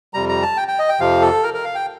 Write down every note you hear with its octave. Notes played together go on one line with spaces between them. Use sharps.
F2 C3 G3 A#5
A#5
A5
G5
G5
D#5
G5
F2 C3 F3 F5
A4
A#4
A#4
F5
G5